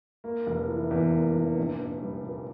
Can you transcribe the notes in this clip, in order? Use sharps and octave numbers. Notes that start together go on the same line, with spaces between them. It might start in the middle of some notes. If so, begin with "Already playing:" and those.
A#3
F1
E3
E2
A#3
F1
A#1
A#1
G3
A#2